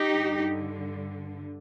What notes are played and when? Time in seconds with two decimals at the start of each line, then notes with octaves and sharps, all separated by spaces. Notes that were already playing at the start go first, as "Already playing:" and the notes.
Already playing: D#4 G4
0.13 G2 D3